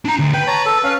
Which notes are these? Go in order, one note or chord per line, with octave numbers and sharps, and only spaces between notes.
D4 A#5
D2
B4 G5
C#5 A5 A#5
A4
C#4 F5